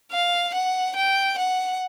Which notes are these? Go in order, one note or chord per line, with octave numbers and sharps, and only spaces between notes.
F5
F#5
G5
F#5